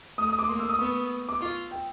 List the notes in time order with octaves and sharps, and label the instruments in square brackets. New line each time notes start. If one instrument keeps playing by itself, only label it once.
[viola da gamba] A3 [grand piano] D#6
[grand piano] D#6
D6
[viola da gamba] A#3 [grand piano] C6
[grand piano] E6
D#6
[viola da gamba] B3 [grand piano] C#6
[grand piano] D6
[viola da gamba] F4 [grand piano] C#6
[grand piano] G5